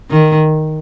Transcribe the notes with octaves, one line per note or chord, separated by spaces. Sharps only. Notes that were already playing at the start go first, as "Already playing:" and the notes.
D#3